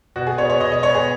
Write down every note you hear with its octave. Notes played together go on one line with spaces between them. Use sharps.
B2 F#4
G#4
B3 C#5
C#5
B2 D#5
D#5
B3 C#5
G#4